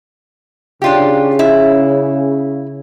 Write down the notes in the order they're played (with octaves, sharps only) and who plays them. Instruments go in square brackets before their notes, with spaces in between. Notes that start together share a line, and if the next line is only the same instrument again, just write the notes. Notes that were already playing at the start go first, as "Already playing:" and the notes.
[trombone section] C#3 [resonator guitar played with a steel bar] D4 F4 G4
[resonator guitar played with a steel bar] E4